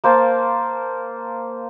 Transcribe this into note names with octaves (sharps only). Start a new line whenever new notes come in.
A#3 C5 F5 A5